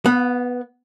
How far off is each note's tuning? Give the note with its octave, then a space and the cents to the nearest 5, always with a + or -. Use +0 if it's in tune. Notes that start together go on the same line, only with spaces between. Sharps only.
B3 +0 F#5 -45